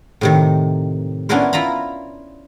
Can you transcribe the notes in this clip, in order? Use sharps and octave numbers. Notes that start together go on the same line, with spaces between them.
A2 C3 D#3
B3 C#4 D4 E4 A#4 C5
E4 F4 A#5 B5